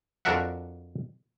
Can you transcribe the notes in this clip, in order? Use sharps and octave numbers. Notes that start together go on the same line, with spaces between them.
F2 D4 F#4 A#4 E5 F#5